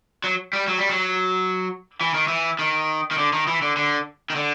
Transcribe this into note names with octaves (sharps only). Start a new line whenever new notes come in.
F#3
G3
F#3
G3
F#3
E3
D#3
E3
D#3
D#3
D3
D#3
E3
D3
D3
D#3
D3